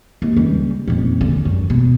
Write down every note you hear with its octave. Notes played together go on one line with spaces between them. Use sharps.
D#2
C#2 G3
D#1 F2
D3
F#2
B2